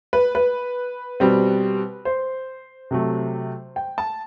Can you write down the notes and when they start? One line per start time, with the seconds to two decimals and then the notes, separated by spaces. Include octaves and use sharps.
0.13 B4
0.35 B4
1.20 B2 G3 C4
2.05 C5
2.91 C3 F#3 A3
3.76 G5
3.98 A5